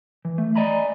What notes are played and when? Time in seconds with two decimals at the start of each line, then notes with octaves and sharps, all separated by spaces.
0.25 E3
0.38 A3
0.56 D5 D#5 G#5 A#5 B5